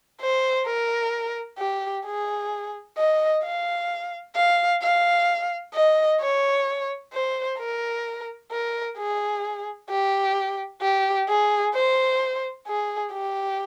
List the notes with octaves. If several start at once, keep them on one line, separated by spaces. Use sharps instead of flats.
C5
A#4
G4
G#4
D#5
F5
F5
F5
D#5
C#5
C5
A#4
A#4
G#4
G4
G4
G#4
C5
G#4
G4